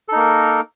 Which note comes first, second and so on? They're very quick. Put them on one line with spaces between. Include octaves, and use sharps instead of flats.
A4 D#4 A#3 A#4